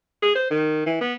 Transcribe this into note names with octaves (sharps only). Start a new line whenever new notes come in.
G#4
C5
D#3
E3
B3